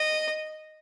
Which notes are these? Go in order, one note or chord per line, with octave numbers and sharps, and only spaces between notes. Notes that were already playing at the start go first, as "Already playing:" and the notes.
Already playing: D#5